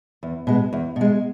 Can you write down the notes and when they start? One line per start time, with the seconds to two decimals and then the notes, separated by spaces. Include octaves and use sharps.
0.23 E2
0.47 B2 G#3
0.73 E2
0.96 B2 G#3